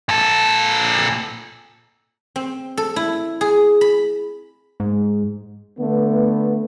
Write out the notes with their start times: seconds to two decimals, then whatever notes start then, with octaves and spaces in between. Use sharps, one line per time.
0.09 A#2 A4
2.36 C4
2.77 A4
2.96 E4
3.41 G#4
3.81 B5
4.80 G#2
5.79 D3 A3 B3